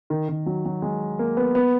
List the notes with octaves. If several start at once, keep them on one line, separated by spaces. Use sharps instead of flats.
D#3
D#3
F#3
F#3
G#3
A#3
B3
B3